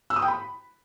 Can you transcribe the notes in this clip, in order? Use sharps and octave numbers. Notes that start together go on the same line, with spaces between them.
E6
D#6
G5
B5